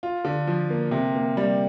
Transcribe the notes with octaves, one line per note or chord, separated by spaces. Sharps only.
F4
D3
F3
A#3
C3
A#3
G3